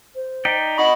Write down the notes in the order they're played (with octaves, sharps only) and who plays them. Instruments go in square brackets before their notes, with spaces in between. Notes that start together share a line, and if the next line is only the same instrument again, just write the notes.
[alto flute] C5
[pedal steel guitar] D#4 D5 G5 [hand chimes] B6
[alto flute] D#4 [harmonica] D#5 B5 [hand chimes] F#5 C#6